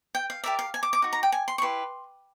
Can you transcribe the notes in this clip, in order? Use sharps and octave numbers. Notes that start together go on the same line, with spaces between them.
G5
F5
G4 A#4 D5 E5
F5
G#5
D6
D6
D#4 F#4
A#5
G5
G#5
C6
C#6
E4 G4 B4 C6